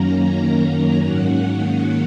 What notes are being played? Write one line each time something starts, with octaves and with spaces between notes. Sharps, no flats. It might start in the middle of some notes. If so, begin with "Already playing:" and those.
Already playing: F#2 D#3 F#3 A#3 C#4 A#5
G#2 D#3 F#3 A#3 C#4 F#5